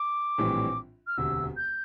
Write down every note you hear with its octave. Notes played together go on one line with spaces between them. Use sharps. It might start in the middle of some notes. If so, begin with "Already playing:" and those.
Already playing: D6
A#1 A2 E3 G3 C4
F6
E1 D2 C3 E6
G6